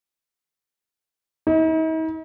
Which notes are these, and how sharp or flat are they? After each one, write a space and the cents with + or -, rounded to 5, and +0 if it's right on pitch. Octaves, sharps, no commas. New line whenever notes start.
D#4 +45